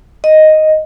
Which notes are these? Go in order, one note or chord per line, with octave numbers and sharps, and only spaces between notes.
D#5